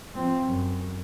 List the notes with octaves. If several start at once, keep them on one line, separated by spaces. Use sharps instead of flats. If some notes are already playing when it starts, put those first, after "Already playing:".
F3 C4
F#2